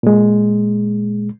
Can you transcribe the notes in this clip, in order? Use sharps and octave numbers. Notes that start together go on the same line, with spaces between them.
A#2 G#3